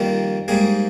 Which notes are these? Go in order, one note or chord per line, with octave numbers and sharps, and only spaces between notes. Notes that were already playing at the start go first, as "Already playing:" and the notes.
Already playing: F2 D#3 G3 A#3
G#2 G3 A#3 G#4